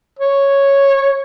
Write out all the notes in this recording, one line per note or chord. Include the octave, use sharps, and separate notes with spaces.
C#5